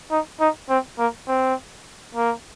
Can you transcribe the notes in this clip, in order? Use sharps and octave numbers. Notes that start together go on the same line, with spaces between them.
D#4
D#4
C4
A#3
C4
A#3